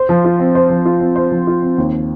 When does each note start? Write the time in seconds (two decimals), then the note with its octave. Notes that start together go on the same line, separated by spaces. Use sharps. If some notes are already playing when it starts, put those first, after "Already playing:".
Already playing: C5
0.09 F3
0.25 F4
0.39 C4
0.55 C5
0.70 F3
0.86 F4
1.00 C4
1.16 C5
1.32 F3
1.47 F4
1.62 C4
1.78 D#2